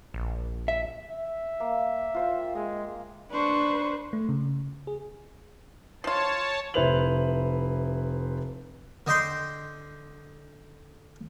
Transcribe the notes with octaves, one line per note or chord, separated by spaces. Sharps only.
A#1
E5
E5
A#3
F4 C5 G5
G#3 D#5
D4 B4 C5 C#6
A3
C#3
G#4
F3 F4 C#5 A5
F1 E4 B4 C5 F7 F#7
D3 D#5 G5 C6